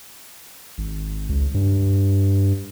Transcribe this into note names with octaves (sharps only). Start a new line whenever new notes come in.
G#1
C#2
G2